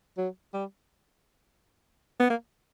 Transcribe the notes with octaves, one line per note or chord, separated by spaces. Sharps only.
F#3
G3
B3
A#3